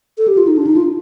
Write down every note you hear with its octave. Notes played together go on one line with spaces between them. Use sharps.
A4
G4
F4
D#4
D4
D#4
F4